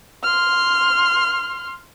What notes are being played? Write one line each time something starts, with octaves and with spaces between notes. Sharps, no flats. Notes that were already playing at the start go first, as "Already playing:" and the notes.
C6 F6